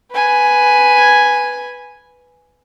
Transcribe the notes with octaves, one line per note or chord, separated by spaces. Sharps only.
B4 G#5